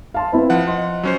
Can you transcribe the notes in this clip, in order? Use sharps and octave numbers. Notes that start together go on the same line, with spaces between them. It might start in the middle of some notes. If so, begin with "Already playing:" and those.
F5 A5 C6
C4 E4 B4
F3 F#5
D#5 C6
F#3 C#4 C5